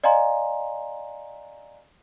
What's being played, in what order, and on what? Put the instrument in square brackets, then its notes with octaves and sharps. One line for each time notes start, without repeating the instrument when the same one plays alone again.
[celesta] D5 D#5 F5 G#5 A#5 C6